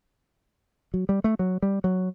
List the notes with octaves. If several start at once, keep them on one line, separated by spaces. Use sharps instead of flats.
F#3
G3
A3
F#3
G3
F#3